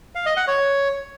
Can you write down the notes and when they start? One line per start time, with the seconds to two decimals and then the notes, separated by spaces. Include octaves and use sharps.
0.15 F5
0.26 D#5
0.37 F#5
0.48 C#5